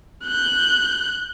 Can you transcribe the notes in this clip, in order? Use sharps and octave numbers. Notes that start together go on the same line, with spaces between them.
F#6 G6